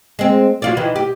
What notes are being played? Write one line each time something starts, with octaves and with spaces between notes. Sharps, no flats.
G#3 C4
F#3 F4 D5
D#3 E3
G4